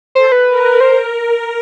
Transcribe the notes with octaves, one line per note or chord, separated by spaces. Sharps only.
A4 C5
B4
A#4
C5